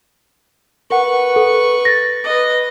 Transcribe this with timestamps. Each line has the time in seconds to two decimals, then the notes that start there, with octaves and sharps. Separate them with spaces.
0.90 A#4 B4 F#5 C#6
1.36 A4
1.85 A6 A#6
2.24 B4 D#5